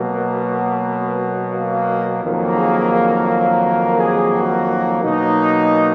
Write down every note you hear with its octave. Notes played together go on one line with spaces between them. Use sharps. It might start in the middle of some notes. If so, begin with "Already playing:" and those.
Already playing: B2 F#3 A#3
B3
A#3
F2 D#3 F#3 A#3
G#4
A#4
A#4
G#4
F#4
B2 F#3 A#3 D#4